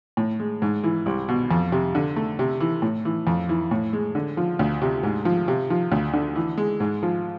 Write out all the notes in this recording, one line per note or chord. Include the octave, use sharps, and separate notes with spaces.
A2
G#3
G#2
E3
C2
B2
F2
C3
D3
A3
C3
E3
A2
E3
F2
E3
A2
G#3
D3
F3
D2
C3
G#2
F3
C3
F3
D2
D3
E3
G#3
G#2
F3